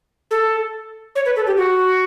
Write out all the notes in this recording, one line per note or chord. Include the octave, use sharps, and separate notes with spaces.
A4
C#5
B4
A4
G4
F#4